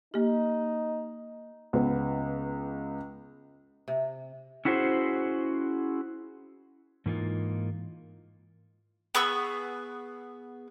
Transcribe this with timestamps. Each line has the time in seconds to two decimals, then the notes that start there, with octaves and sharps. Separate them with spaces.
0.14 A#3 D#4 G4
1.73 C#2 B3
3.88 C3
4.65 C#4 E4 F#4 G#4 C5
7.06 G#2 E3 A#3 D#4 F4
9.15 B3 G#4 C#6 E6